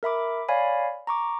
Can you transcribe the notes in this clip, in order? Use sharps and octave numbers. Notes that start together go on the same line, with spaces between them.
A#4 E5 B5 D6
C#5 D5 F5 G#5 B5
A#5 C#6 D6